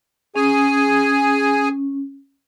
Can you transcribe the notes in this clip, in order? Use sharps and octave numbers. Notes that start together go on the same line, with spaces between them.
C#4 G#4 G#5